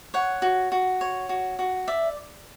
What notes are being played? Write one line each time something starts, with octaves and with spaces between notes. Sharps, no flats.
C#5 F#5
F#4
F#4
C#5
F#4
F#4
D5 E5